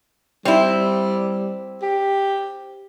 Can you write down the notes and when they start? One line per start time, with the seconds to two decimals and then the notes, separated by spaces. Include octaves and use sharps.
0.45 G3 C4 E4
1.82 G4